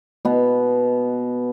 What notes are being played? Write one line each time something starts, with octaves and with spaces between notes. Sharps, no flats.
B2 B3